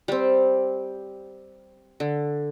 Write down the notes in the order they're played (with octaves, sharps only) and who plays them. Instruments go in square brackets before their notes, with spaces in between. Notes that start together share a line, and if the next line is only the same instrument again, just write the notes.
[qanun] G3 C4
D3